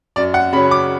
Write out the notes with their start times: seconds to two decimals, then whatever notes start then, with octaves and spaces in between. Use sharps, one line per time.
0.16 F#2 D5
0.34 F#5
0.53 C#3 F#3 C#4 B5
0.71 D6